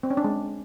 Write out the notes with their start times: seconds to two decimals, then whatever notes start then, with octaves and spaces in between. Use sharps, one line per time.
0.03 C4
0.10 C#4
0.17 D4
0.24 G#3